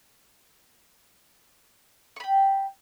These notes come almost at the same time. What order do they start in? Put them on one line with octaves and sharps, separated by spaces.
C#6 B5 G5